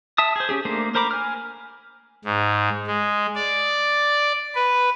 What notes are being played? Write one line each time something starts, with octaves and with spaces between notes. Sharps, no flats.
E5 A5 D#6
G#4 C5
C#4 G4 G#4
A3 A#3 D4 C5
A#4 C5 A#5 B5 D6
G#5 F6
G#2
G#3
D5
B4